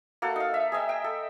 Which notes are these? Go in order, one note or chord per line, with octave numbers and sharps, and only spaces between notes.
A#3 F#4 A4
D#4 F5
E5
G#4 D#5 E5 G5
G5
A4